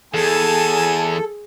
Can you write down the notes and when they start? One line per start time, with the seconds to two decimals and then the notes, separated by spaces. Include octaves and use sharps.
0.14 E2 G#4 A4 G#5 A5